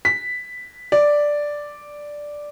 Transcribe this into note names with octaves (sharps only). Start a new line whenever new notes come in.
B6
D5